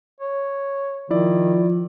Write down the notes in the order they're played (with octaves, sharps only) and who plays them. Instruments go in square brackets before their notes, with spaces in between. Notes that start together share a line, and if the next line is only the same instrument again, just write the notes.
[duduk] C#5
[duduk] D#3 [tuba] F3 [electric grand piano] E4 D5